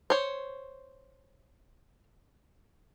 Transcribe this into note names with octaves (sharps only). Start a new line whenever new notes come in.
C5 C#5